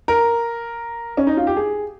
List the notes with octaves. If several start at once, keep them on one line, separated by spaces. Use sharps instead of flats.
A#4
C#4
D#4
F4
G4
G#4